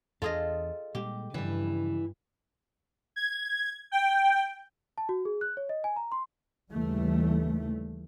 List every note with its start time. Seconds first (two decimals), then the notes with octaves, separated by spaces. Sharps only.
0.22 E2 D4 F4 G#4 A4 D#5
0.95 A#2 G3 G#3 G4
1.34 G2 C#3 E3 F3 G3
3.16 G#6
3.91 G5
4.98 A5
5.09 F#4
5.25 G#4
5.41 F#6
5.57 C#5
5.69 D#5
5.84 G#5
5.96 A#5
6.12 C6
6.71 D#2 C#3 E3 G3 A3